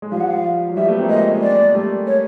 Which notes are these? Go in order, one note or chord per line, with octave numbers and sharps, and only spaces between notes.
G#3
F3 G3 F5
F#5
F5
F#3
F3 G3 E5
A3 B3
A#3 C4
G#3 A#3 D#5
D5
G3 A3
C#5